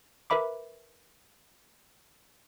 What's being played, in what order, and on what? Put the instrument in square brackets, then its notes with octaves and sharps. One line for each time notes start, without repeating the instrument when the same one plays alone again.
[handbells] A#4 B4 E5 B5 D6